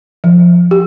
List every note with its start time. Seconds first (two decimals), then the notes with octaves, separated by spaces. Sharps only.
0.24 F3
0.71 G4